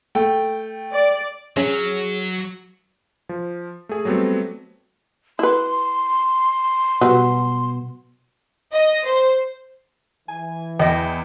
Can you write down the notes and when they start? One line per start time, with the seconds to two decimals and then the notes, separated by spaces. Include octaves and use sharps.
0.15 A3 G5
0.92 D5
1.57 F#3 C#4 G#4
3.29 F3
3.89 A3 G#4
4.05 F#3 G3 A3 B3 C4
5.39 E4 B4 C6
7.01 B2 F#3 G3 B4 F#5
8.74 D#5
9.06 C5
10.28 E3 G#5
10.79 E2 D#5 E5 G5